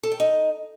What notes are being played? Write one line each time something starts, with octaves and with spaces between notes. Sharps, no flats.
A4
G5
D#4